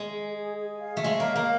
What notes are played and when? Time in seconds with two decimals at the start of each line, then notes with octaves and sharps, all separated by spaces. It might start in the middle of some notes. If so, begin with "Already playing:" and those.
Already playing: G#3
0.09 G#4
0.33 G#4
0.56 G#4
0.80 F5
0.97 A3
1.04 G#3 C#5
1.20 A#3
1.28 F5
1.36 A#3